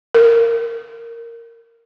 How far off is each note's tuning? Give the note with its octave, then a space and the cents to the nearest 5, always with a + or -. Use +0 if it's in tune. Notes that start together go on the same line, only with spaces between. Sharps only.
A#4 -15